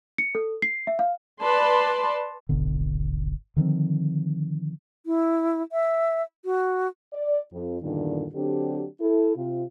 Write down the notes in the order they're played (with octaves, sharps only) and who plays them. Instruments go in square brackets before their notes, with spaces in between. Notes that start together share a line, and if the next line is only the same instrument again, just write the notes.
[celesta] C#7
A4
C7
E5
F5
[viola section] B4 D5 A5 C6
[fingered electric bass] D1 G#1 B2 D3
D3 D#3 F3 C4
[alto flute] E4
E5
F#4
[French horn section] D5
F2
E2 G2 A#2 D3 D#3
D3 F#3 C4 D4 G4
E4 A4
C3 F4